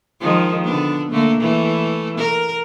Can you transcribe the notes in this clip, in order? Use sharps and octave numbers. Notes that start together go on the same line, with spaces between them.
D#3 F3 G#3
D3 B3 D4
D3 A3 A#3
E3 A3
A#4